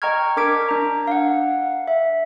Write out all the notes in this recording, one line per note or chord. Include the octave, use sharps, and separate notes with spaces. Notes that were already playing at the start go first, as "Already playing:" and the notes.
D#5 G5 A#5 C#6 F6 G#6
D4 A#4 D6 G#6 B6 D7
D4 A#5
F5 F#5
E5